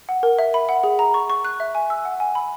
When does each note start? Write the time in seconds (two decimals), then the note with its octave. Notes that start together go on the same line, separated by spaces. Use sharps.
0.09 F#5
0.23 A#4
0.39 E5
0.54 B5
0.69 F#5
0.84 G#4
0.99 A#5
1.14 C#6
1.30 C#6
1.45 F#6
1.60 E5
1.75 G#5
1.90 E6
2.05 F#5
2.20 G#5
2.35 B5